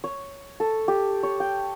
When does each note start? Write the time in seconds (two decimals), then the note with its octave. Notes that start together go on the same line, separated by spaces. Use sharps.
0.04 C#5
0.60 A4
0.88 G4
1.23 C#5
1.40 G5